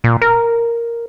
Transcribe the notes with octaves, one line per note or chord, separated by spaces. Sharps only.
A#2
A#4